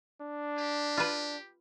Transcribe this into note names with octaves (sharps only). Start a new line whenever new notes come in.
D4
G4
F4 B4